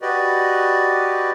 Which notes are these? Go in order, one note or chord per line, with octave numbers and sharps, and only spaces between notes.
F#4 G4 B4 D5 D#5